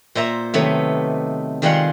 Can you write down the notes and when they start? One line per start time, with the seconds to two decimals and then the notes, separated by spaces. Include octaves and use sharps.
0.15 A#2 C5 E5 A#5
0.54 C3 D#3 F#3 A3 B3
1.62 D#3 G3 G#3 F4 F#5 C6